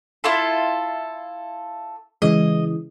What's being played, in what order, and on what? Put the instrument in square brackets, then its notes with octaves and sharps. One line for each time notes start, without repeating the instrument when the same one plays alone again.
[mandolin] E4 F4 A4
[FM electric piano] C#3 E3 G#3 [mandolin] D#5